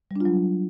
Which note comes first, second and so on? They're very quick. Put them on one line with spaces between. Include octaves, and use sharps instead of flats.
G3 D4 F4 F#3